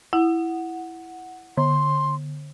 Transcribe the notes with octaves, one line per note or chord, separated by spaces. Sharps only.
E4 F#5
D3 C6